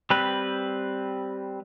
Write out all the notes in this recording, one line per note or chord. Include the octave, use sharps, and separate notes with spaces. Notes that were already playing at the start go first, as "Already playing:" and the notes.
G3 C4 B4